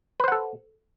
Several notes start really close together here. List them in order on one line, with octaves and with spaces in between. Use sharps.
B4 C5 F#5 A4